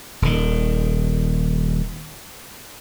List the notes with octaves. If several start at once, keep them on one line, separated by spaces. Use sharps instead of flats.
D#1 D#3